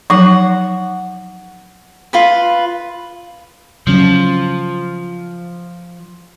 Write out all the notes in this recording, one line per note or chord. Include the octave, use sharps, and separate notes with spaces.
F3 F#3 D#4 F#5
F4 B4 B5
C#3 F3 F#3 C#4